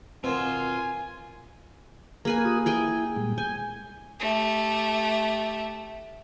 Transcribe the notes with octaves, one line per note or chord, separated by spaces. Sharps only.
B2 D#3 C4 F4 G#5
A#3 G#4 A#4 B4 G#5
F4 G4 D#6
E4 G#4 G5 G#5
A#2 G3 G#3
G#5 G6
A3 G4